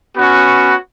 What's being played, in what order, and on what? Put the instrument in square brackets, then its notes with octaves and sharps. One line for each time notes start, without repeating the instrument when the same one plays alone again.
[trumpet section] B3 C#4 F#4